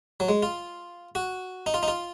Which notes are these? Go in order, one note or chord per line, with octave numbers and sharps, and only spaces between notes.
F#3
G#3
F4
F#4
D#4
F4
D#4
F4